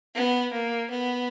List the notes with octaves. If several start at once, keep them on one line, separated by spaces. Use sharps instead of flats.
B3
A#3
B3